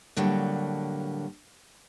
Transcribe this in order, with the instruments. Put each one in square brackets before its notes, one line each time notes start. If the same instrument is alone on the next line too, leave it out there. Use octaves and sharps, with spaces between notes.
[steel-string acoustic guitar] A2 D3 F#3 G3 A#3